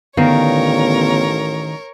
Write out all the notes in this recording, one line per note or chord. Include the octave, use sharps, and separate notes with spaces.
A1 D3 D#3 B3 A#4 C#5 D5 F5